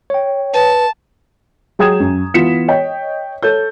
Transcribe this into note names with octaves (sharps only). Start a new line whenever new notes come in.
C#5 G5
B4 A5
F#3 G#4 G5 D#6 G#6 E7
F#2
E3 B3 F4 B6 C#7 E7
C#5 D#5 G5
A4 C#5 G6